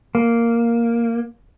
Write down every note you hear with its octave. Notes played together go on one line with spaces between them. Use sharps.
A#3